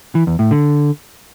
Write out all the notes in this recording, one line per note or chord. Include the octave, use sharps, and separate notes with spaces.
E3
E2
A2
D3